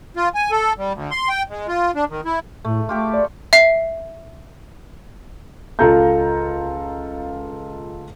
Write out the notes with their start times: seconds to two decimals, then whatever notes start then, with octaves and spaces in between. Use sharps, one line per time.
0.17 F4
0.35 G#5
0.51 A4
0.78 G3
0.93 D2
1.11 C6
1.29 G5
1.50 G#3
1.68 F4
1.95 D4
2.10 D#3
2.25 E4
2.65 A2 A3
2.89 A3 F4 G4 A4 D6
3.14 D5
3.53 E5 C7
5.79 C#2 F4 A4 F5 A#5 G6